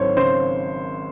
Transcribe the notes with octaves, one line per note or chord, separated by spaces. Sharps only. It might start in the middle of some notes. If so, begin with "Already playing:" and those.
Already playing: G#1 F#3 C5 C#5
C#3 C5